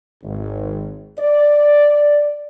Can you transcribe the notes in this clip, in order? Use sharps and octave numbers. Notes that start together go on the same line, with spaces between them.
G#1
D5